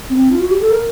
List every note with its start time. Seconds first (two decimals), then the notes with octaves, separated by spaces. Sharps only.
0.10 C4
0.31 F4
0.40 F#4
0.51 G4
0.61 A4
0.71 A#4